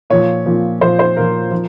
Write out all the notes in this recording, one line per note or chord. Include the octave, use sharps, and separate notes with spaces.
A#2 F3 C#5
A#2 F3
A#2 F3 C5
C5
A#2 F3 A#4
F3